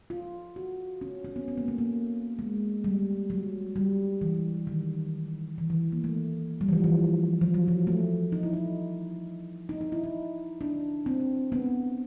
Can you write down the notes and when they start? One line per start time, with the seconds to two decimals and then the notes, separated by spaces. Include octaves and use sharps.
0.10 F4
0.56 F#4
1.01 C#4
1.25 C#4
1.36 B3
1.48 B3
1.58 A#3
1.68 A3
1.78 A#3
2.39 G#3
2.84 G3
3.30 F#3
3.76 G3
4.21 E3
4.67 D#3
5.58 E3
5.70 E3
5.92 A#3
6.04 A3
6.61 G3
6.69 E3
6.73 F3
6.84 E3
7.41 F3
7.54 F#3
7.68 F3
7.87 A3
8.32 D#4
8.43 E4
8.53 D#4
9.69 D#4
9.81 D#4
9.92 E4
10.04 D#4
10.61 D4
11.06 C4
11.52 B3